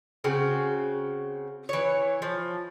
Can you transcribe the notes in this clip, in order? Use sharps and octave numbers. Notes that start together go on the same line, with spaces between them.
C#3 C4 F#4
E3 C#5
F3